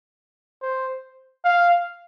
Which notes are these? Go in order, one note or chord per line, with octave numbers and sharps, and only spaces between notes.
C5
F5